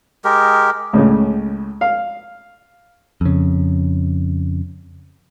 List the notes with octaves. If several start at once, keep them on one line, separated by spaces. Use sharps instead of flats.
G#3 G4 A#4
C#2 A2 C#3
F5
F2 C#3